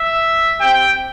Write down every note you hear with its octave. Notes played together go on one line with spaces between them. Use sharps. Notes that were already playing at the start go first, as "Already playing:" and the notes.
Already playing: E5
C4 G4 G5